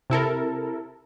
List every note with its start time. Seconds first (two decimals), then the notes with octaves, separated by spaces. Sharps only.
0.10 C3 E4 A4 A#4